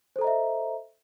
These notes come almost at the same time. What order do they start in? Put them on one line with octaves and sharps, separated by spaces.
C5 A4 A#5 D#5 E5